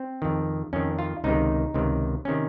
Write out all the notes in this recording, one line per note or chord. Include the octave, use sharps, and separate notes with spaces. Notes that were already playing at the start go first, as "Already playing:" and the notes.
Already playing: C4
F2 D#3
F2 D#3 C#4
F4
C#2 C3 D#3 D#4
C#2 C3 D#3
C3 D#3 C#4